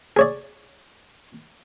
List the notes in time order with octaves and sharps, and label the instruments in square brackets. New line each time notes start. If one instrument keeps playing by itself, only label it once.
[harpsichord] G#4 C#5 D5